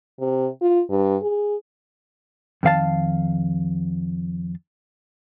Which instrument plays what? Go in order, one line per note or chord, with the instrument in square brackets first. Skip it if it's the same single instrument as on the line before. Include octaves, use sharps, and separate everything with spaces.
[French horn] C3
F4
G2
G#4
[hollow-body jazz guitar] F2 D#3 F5 A5